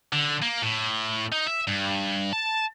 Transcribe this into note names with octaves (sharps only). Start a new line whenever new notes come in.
D3
A#3
A2
D#4
E5
G2
A5